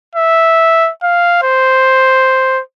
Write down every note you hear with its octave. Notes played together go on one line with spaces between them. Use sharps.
E5
F5
C5